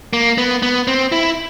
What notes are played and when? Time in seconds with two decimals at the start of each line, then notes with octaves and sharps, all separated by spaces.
0.13 A#3
0.38 B3
0.63 B3
0.87 C4
1.12 E4